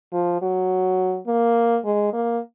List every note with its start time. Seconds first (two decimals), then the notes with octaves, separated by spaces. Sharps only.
0.13 F3
0.42 F#3
1.27 A#3
1.85 G#3
2.13 A#3